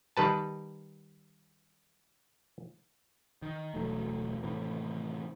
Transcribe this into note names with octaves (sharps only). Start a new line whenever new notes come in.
D#3 G3 B4 A5
D#3
E1 D2 F#3 A3
A2 C3 D#3 E3